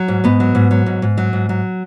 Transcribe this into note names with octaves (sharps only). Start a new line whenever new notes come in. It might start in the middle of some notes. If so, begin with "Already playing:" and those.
Already playing: F#3
G#2
G#2 B3
F#3
G#2
F#3
G#2
G#2
F#3
G#2
F#3